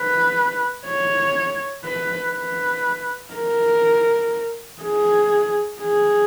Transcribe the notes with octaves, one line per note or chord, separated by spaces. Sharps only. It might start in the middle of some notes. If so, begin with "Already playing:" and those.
Already playing: B4
C#5
B4
B4
A#4
G#4
G#4